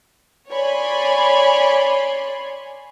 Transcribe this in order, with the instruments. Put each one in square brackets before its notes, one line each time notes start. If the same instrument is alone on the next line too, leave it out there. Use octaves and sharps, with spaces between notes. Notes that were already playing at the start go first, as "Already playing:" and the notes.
[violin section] C#5 D5 G#5 B5 C6